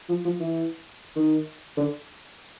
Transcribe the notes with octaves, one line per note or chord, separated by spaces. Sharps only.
F3
F3
E3
D#3
D3